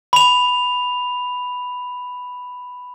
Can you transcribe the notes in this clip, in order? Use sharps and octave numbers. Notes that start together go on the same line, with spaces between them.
B5 F7